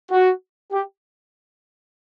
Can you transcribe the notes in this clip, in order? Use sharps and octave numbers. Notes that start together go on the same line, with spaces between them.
F#4
G4